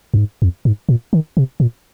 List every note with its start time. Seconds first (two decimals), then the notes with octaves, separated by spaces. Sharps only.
0.14 F2
0.17 G#2
0.42 F2
0.65 G#2
0.89 A#2
1.13 D#3
1.37 C3
1.60 A#2